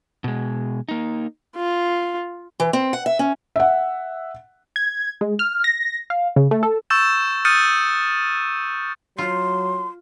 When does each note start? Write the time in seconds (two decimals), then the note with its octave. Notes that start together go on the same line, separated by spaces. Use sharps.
0.24 B2 G#3
0.89 A#3 D#4
1.56 F4
2.60 E3
2.73 C4
2.93 F#5
3.06 E5
3.19 C#4
3.56 E5 F#5
4.76 G#6
5.21 G#3
5.39 F6
5.64 A#6
6.10 F5
6.36 C#3
6.51 A3
6.63 A4
6.90 C#6 E6 G6 A6 E7
7.45 D#6 F6 G6 A6 C#7 D#7
9.18 F#3 F4 C6